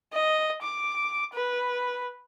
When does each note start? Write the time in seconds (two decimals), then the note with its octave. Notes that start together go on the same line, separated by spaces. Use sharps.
0.13 D#5
0.62 D6
1.34 B4